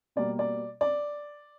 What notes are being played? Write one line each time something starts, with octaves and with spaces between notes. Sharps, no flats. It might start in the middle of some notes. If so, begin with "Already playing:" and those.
B2 G3 A#3 D5
D5
D5